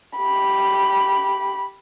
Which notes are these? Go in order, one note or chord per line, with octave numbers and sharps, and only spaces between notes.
G4 B5